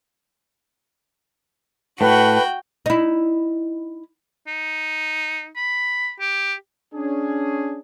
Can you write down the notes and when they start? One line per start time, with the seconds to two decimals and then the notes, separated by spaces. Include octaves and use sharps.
2.01 A2 F#4 B4 G5
2.86 D#4 E4
4.47 D#4
5.56 B5
6.20 G4
6.94 C#4 D4 G#4